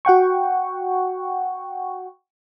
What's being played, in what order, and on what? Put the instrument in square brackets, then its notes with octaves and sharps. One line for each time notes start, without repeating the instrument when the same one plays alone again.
[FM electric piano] F#4 F#5 G5 C#6